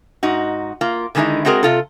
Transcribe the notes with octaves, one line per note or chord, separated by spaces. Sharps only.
G#2 D#4 F#4
A#3 F4
D3 D#3 G#3 B3 D#4 E4
G#3 C4 F#4 G#4 A#4
C3 F4 A4